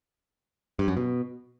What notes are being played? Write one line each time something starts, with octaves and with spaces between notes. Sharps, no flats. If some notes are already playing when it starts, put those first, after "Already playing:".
G2
F#2
B2